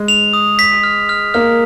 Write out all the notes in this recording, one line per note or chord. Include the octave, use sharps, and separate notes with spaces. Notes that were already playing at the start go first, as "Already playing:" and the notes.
Already playing: G#3
F7
D#6
B6
F6
F6
A#3 F6